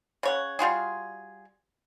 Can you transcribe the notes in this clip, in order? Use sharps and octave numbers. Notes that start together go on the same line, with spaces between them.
C#3 C#5 F#5
G3 F4 F#4 G#4